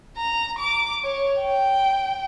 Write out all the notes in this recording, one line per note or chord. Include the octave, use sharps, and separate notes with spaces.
A#5
D6
C#5
G5